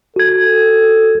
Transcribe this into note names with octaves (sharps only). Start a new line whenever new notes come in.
F#4 A4 G#6